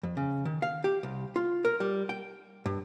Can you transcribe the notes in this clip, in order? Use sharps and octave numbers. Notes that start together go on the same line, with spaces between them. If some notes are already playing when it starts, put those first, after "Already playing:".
F2
C#3
D#3
F5
G4
C2
F4
A#4
G3
G5
G2